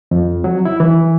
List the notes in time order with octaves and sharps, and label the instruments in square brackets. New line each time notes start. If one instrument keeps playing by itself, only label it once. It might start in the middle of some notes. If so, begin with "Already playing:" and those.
[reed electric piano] F2
F#3
E4
E3